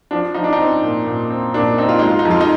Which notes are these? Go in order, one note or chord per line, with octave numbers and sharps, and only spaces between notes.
F3 D4
F3 D#4
D4
D#4
C4
A#2
A#2
C4
A#2 D4
C4 D#4
F4
G#3 D#4
F4
D#4
F2
F4
D#4